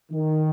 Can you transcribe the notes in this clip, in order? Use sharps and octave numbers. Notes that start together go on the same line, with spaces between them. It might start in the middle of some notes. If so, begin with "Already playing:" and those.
D#3